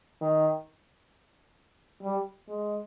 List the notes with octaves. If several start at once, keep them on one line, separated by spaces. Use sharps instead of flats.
D#3
G3
G#3